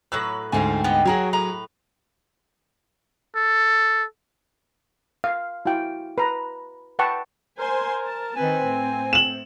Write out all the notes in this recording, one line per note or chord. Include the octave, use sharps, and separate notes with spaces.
A2 F#3 B4 E6 F#6
D2 G#2 A3 C4 F4 G#5
B3 G4 D#5
F#3 F#4 G#4 A#4 C#5
A2 B4 A#5
A4
F5
E4 F#4 F5 G5
B4 A#5
B4 F#5 G5 A5 C#6
A#4 C5 G#5 C6
A5
D#3 C4 B4 G#5
A2
E7 F#7